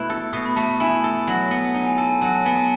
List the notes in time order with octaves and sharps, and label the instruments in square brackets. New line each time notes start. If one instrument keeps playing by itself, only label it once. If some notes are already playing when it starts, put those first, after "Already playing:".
Already playing: [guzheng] B2 A3 E4 [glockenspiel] F#6
[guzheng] A4
[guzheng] B2 [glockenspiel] D#6
[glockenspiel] B5
[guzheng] A3 [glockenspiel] A5
[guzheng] E4 [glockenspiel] G#5
[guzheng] A4
F#3
B3
D#4
[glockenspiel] G#5
[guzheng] A4 [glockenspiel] A5
[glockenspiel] G#5
[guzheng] F#3 [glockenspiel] A5
[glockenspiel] A5
[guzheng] B3 [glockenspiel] G#5
[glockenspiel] A5